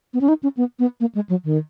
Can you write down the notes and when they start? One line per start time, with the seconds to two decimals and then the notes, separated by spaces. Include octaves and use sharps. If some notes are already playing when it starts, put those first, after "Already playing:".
0.14 B3
0.21 C#4
0.28 D#4
0.43 C#4
0.57 B3
0.79 B3
1.00 A#3
1.15 G#3
1.29 F#3
1.44 D#3